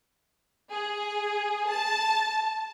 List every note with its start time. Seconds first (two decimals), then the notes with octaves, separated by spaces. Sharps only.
0.71 G#4
1.68 A5